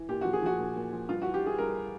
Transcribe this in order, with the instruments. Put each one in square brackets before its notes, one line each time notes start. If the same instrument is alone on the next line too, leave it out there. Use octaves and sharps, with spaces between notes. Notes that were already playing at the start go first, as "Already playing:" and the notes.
Already playing: [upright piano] E3
A#2 G4
F3 F#4
G#4
F3 F#4
A#2
A#2
F3
G2 F4
E3 F#4
G4
E3 G#4
G2 A#4